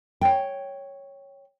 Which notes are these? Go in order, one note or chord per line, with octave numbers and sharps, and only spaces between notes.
C#5 G5